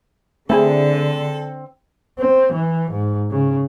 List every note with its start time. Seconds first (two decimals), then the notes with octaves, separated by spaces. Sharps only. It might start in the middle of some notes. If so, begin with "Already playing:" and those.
0.50 D3 A3 C4 E4 G#4 A4
2.19 C4
2.53 E3
2.92 G#2
3.31 C#3